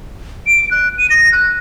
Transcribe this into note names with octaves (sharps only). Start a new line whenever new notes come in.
D7
F#6
D#7
A#6
F#6